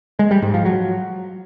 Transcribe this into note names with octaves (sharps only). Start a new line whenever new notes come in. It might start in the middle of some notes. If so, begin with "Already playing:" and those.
G#3
G3
G#2
F3
F#3